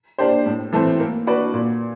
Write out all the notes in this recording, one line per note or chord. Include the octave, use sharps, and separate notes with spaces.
A#3 D4 G4 C5
A2
E3 A3 C4
A#3
D4 F#4 B4 D5
A#2